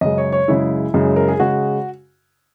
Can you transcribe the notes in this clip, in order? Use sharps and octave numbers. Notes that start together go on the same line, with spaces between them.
F#2 C#3 G#3 D#5
C#5
C#5
F#2 C#3 G#3 E4
F#2 C#3 G#3
A#4
G#4
C#3 G#3 F#4